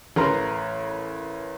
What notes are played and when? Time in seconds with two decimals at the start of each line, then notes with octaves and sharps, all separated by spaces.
0.16 A1 A#4 B4 A#5 C6